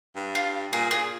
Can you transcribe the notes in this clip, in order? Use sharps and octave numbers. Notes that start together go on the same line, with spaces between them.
G2
F4
A#2 G#4
A#2 G#4